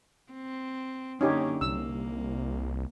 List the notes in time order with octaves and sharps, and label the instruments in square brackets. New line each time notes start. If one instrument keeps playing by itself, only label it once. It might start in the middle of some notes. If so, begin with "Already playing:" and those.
[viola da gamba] C4
[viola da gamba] F#2 D3 A#3 [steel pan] C#4 D#4 G4
[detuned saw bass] C2 [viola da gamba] A#3 [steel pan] E6